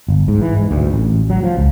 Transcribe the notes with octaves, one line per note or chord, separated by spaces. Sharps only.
G1
G#2
E3
G#2
D2
A1
F#3
F3
C#2